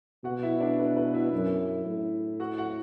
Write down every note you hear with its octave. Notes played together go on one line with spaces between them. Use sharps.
B2 F#4 F#5
E4 E5
D4 D5
B4
B4
E4 E5
F#2
A2
F#4 F#5
F#4 F#5